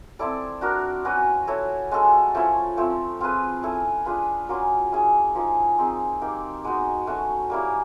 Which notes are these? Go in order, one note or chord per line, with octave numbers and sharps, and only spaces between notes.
C4 E4 A4 D5
D4 F#4 A#4
C#4 F#4 B4
E4 A4 C#5
G#3 C#4 F#4 A4
F3 A3 C#4 E4
F3 A3 C4
C4 F4 G#4 B4
C#4 E4 A4
D4 F4 G#4 B4
F#3 A#3 C#4 F4
C#4 E4 G#4
F3 A#3 D#4 G#4
C4 D#4 G#4
A#3 D#4 G4
G#3 B3 D#4 F#4
A3 C#4 F#4
G3 A#3 C#4 E4